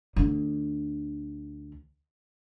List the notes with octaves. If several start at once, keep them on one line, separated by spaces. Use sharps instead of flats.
D2 D3